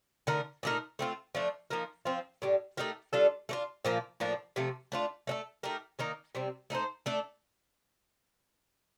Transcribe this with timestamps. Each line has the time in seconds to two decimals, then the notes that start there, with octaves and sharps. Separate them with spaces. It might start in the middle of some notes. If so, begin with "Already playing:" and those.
0.27 D3 A3 D#4 A#4
0.63 A#2 A3 D#4 A#4
0.99 A3 C4 F4
1.35 F3 A3 D4
1.70 F3 A#3 D#4 A#4
2.05 F3 C4 F4
2.42 A2 G3 D4
2.77 A3 D#4 G4 A#4
3.13 G3 D4 F4 A4
3.49 A3 D4 F4
3.85 A#2 F3 A#3
4.20 A2 F3 A#3 D4
4.56 C3 F3 A3
4.92 A3 D4 F4
5.27 A3 D4 A4
5.63 A3 D#4 G4 A#4
5.99 D#3 A#3 D#4
6.35 C3 G3 C4
6.70 A3 D#4 A4 C5
7.06 A3 D4 A4